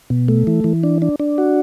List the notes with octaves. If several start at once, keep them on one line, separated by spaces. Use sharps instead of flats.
B2
A3
E3
E3
D4
D4
D4
F#4